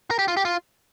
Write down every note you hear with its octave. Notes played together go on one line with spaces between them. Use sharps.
A#4
G4
F4
G4
F4